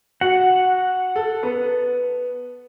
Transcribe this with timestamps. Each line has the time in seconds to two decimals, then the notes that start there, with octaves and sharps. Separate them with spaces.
0.21 F#4 F#5
1.16 A4
1.43 B3